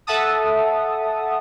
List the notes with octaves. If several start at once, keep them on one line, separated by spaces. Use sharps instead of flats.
A4 E5 F#5 A5 D#6